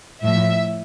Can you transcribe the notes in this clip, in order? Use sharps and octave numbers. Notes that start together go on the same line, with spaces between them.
A2 F3 E5